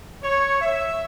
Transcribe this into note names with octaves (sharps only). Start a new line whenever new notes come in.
C#5
E5